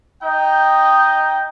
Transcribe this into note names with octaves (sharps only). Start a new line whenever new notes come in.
D#4 D#5 G5